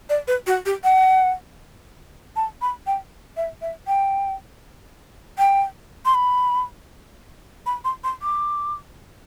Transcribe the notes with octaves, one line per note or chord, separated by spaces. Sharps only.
D5
B4
F#4
G4
F#5
A5
B5
G5
E5
E5
G5
G5
C6
B5
B5
C6
C6
D6